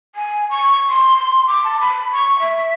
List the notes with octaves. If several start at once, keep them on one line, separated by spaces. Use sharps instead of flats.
G#5
C#6
C6
D6
A5
B5
C#6
E5